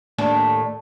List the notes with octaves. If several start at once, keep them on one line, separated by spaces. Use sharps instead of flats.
D#2 A2 D4